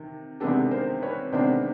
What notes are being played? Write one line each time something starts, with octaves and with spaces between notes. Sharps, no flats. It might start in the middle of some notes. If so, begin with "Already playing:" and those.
Already playing: C3 D#3
C3 D#3 G#3 B3 D4 G4 A4
A#4 C5
B4 C#5
C3 D#3 G#3 B3 D4 C5 D5